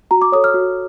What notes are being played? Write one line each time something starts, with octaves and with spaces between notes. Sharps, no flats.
F#4 A#5
D6
A4 C#5 D#6
F6
F#4